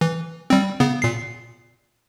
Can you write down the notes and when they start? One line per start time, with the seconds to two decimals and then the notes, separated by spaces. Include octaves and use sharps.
0.01 E3
0.50 G3 C4
0.80 C#3 B3
1.02 A#2 C7